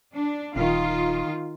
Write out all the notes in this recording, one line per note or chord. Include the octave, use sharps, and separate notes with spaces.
D4
D#1 D#3 F4